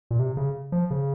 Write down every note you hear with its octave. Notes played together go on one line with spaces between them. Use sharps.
A#2
C3
C#3
F3
C#3